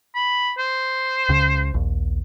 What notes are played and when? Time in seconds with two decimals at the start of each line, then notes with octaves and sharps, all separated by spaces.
0.15 B5
0.58 C5
1.29 C#2 C#3
1.74 A#1 D#2